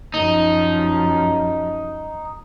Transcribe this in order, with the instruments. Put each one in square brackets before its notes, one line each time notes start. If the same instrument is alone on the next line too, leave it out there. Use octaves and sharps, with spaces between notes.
[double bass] F#2 F3 [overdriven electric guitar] D#4